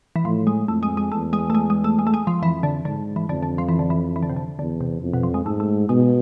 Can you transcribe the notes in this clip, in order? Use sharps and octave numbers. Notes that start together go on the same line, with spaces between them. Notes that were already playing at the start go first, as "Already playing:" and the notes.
E3
A2 F3
G#3
F2 A3
G#3
G#3
E2 A3
G#3
A3
G#3
G#3
A3
G#3
A3
G#3
F3
F2 E3
D3
G#2 D3
E3
F2 D3
D3
F3
E3
D3
E3
E3
D3
C3
D3
E2 D3
C3
F2
B2
F3
G#3
G#2 A3
A3
B2 G#3